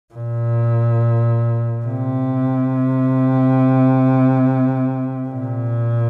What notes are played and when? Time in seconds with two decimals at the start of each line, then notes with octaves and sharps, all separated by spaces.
0.14 A#2
1.86 C3
5.29 A#2